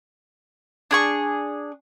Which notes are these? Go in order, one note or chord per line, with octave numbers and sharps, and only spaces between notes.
D4 G#4 C#6